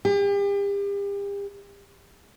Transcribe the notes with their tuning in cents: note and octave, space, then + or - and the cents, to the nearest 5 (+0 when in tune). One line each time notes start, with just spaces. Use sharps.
G4 +40